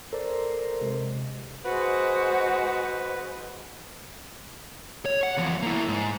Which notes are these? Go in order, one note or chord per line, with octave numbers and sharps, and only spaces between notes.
A4 A#4 C5 D5
C3 G#3
G#3 F#4 B4 C5
C#5
F#5
E2 F3
A#3 E4
G#2